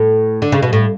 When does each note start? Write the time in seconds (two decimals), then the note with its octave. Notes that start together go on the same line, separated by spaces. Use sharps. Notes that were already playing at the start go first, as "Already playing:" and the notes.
Already playing: A2
0.42 D3
0.52 C#3
0.62 B2
0.73 A2